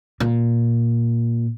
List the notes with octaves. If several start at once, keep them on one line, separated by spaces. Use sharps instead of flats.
A#2